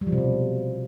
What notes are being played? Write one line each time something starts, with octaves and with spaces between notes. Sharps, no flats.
G3
F3
C3
B2